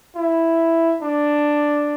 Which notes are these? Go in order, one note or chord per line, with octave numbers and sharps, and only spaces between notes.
E4
D4